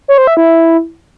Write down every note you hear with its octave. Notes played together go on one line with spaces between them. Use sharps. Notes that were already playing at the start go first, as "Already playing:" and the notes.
C#5
C5
E5
E4